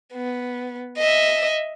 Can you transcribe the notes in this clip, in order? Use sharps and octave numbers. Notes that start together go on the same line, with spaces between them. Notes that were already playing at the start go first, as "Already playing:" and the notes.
B3
D#5 E5